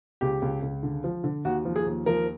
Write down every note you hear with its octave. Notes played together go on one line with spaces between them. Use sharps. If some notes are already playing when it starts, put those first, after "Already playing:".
C#2 G4
C#2
C#2
D3
F3
D3
D#2 F#4
F3
G#4
D#2
F3 A#4